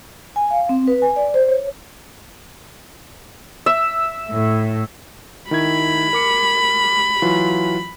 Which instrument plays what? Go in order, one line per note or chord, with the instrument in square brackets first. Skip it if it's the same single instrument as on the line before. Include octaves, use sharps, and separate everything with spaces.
[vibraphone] G#5
F5
C4
B4
G#5
D5
C5
C#5
[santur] E5
[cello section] A2
[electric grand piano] D#3 E4 G#6 [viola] B5
[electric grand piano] A#4 D6 C#7
E3 F#3 F4